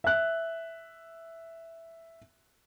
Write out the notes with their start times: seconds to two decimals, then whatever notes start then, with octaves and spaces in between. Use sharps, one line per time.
0.04 E5 F#6